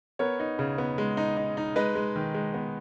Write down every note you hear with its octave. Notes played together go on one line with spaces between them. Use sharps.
B3 A#4 C#5
D#4
C#3
B3
G#3
D#4
D#4
D#4
G#3 B4 D#5
G#3
D#3
G#3
B3